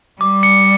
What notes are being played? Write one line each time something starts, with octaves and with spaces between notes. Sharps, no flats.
G3 D6
C#7